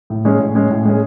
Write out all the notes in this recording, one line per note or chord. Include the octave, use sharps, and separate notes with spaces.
A2
G#3 C#4 G#4
A2
G#3 C#4 G#4
A2
G#3 C#4 G#4